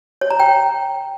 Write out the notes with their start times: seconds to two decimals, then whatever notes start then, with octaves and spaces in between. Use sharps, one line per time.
0.21 C#5
0.30 A#5
0.40 G5